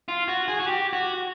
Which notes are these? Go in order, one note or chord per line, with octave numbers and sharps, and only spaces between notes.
F4
F#4
G#4
F#4
G4
F#4